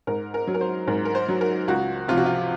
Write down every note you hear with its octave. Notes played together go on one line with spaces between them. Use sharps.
G#2 A#4
A#4
F#3
A#4
C5
G#2 A#4
A#4
C5
F#3
A#4
C#2 F#4
C3 F3 F4
F#4
F4